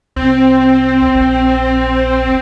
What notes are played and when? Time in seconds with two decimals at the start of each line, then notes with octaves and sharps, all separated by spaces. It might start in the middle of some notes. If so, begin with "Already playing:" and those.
0.16 C2 C4
1.15 A#1